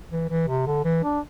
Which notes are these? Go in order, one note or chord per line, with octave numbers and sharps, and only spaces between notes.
E3
E3
C3
D3
E3
D4